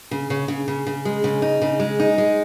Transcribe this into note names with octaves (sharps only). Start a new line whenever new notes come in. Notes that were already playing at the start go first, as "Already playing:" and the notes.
C#3
C#3
C#3
C#3
C#3
G#3
C#3
D#4
C#3
G#3
D#4
G#3